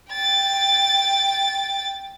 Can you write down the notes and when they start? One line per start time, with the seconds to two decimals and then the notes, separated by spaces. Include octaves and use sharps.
0.12 G5 A6